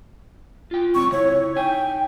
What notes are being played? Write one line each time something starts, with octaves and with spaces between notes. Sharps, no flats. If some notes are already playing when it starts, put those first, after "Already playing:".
F4 G5
C#2 F#2 C4 C#6
C#3 E4 C#5
D#4 G5 G#5